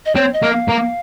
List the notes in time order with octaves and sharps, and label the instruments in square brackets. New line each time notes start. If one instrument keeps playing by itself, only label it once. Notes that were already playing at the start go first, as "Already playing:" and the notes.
[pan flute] D#5
[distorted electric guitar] C4 [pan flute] C#5
[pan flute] D#5
[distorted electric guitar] A#3
[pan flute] F5
[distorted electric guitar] A#3